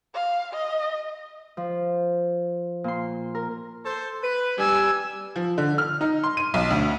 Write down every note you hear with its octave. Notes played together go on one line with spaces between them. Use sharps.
F5
D#5
F3
A#2 C6
A#4
A4 C5
B4
G3 G#5 E6
F3
D3
F6
D#4
C6
D#7
B1
D2